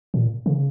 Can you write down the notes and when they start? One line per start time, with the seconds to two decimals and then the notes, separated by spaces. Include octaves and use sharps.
0.14 A#2
0.46 C#3